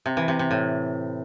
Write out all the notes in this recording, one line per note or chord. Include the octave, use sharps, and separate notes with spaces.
C3
E3
C3
C3
A2